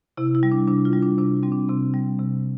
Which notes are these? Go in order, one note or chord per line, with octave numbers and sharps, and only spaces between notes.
C3 E4
E4
G3
D4
C3 D4
F4
G3
D4
C3 D4
G3 C4
D4
C3 C4
G3
C3